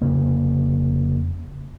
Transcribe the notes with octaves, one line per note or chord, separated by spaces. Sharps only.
F1 C#3 A#3